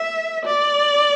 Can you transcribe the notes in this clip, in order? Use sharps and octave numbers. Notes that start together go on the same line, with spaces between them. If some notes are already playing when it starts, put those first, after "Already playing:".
Already playing: E5
D5